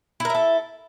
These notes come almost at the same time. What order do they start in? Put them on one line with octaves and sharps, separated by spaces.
E4 A#4 E5 A4